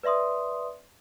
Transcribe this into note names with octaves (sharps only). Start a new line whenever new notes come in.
B4 D5 E5 C6 D#6